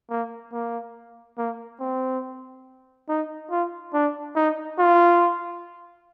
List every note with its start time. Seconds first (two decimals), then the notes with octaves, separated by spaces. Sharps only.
0.10 A#3
0.53 A#3
1.38 A#3
1.80 C4
3.09 D#4
3.51 F4
3.94 D4
4.36 D#4
4.79 F4